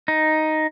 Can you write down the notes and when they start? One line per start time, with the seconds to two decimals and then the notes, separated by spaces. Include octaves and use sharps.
0.08 D#4